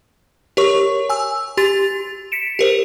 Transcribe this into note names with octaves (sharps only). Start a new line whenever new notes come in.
G4 A#4 C#5 C#6
G#5 E6
G4 C6 A6
B6 C#7 D7 E7
G4 A#4 C5